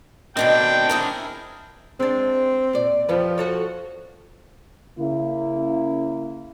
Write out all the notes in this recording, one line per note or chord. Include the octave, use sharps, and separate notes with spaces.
B2 D3 D#3 C4 D4 G5
E4 G#4 A#4
G#3 C4 D4
A#2 D5
F2 F3 G3 B4
F#4 A4 C#5
C#3 A#3 E4